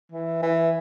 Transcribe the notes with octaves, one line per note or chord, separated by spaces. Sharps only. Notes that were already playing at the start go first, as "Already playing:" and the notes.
E3
E3